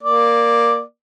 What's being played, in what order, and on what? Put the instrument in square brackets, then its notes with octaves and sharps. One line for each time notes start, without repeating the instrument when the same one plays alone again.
[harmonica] A#3 D5